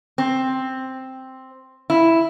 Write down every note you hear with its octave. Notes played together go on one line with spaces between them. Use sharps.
C4
E4